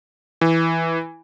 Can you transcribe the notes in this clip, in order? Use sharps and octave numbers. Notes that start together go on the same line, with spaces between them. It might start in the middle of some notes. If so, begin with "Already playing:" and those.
E3